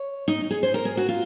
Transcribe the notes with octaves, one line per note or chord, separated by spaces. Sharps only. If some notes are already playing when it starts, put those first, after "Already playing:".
Already playing: C#5
D#4
G#4
C5
A#4
G#4
F#4
F4